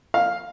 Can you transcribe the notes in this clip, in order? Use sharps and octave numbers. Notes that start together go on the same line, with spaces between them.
F5